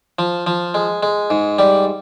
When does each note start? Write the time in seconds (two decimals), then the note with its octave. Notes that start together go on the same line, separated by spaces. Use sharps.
0.19 F3
0.47 F3
0.74 G#3
1.03 G#3
1.30 G#2
1.59 G3